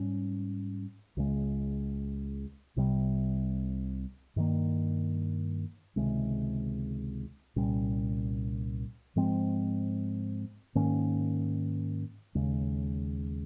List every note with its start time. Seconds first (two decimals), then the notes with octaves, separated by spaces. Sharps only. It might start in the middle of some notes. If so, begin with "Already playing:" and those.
Already playing: G#2 G3 C#4
1.17 C#2 C#3 G#3
2.76 C2 C3 G3
4.36 G2 D#3 A#3
5.96 C#2 C3 D#3 G#3
7.56 C2 A#2 G3 C#4
9.16 G#2 F3 G#3 C4
10.75 G#2 D#3 A#3 C#4
12.35 D#2 C#3 G#3